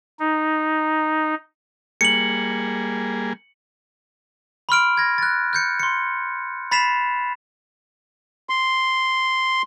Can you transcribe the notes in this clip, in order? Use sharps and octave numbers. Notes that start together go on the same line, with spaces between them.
D#4
G3 A#3 G#4 C#7 F#7
B5 C6 F6 D7
G#6 A#6
F#6 A6
F#6 G6 C#7
C6 C#7
B5 A6 B6 C7 E7 F7
C6